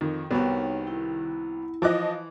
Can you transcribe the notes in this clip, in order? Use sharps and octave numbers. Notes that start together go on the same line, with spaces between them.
F2 D#3
C2 B3 F#4 G4 C#5
E4
E3 F3 D#5 D6 F#6